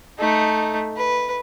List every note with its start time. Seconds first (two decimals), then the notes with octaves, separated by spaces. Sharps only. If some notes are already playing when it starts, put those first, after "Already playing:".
0.19 A3 D#4
0.97 B4